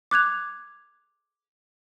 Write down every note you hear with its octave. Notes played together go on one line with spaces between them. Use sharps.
D6 F#6 G#6 F7